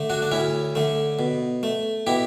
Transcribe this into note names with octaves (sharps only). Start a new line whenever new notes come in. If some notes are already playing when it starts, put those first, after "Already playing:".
Already playing: D3 A3
D4 F#4
D4
D2 C#4 E4
D3 A3
B2
A3
B2 E4 G4